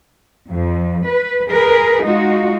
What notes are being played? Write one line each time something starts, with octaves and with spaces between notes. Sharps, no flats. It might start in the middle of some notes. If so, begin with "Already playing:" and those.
F2
B4
G#4 A#4 B4
G#3 D#4 F4 F#4